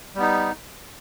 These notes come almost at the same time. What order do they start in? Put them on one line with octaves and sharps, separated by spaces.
G3 B3 D#4